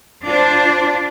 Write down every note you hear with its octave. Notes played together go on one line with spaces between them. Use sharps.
D4 F4 C5 D5